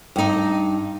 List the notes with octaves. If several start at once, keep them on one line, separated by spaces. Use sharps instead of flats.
G2 D#4